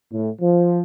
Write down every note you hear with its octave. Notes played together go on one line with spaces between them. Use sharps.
A2
F3